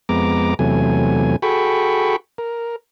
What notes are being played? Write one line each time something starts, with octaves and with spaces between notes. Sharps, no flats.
F2 G#3 B3 A#5 D6
E2 C3 F#3 A3 G#5
F#4 G#4 A4 G5 B5 C#6
A#4